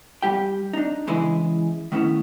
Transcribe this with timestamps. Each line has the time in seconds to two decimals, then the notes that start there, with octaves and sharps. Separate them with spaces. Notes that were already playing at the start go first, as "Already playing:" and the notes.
0.22 G3 G4 G5
0.73 D4 D#4
1.07 C#3 E3 G#3 E4 B4 D#5
1.92 D#3 A3 B3 C#4 E4